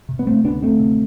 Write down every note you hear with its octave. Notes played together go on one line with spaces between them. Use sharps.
C3
B3
C3 A3 C4
D2 B3 D4
D2 A3 C4
C3